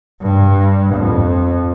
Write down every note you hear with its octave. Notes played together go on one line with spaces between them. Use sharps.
G2
F2